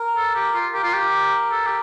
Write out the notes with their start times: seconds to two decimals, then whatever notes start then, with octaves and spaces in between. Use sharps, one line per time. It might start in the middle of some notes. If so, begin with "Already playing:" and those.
Already playing: A#4
0.17 A4
0.35 G4
0.54 F4
0.74 G4 A#4
0.84 F4
0.93 G4
1.51 A4
1.67 G4